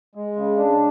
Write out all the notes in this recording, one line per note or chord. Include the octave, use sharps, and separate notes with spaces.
G#3
C#3
D4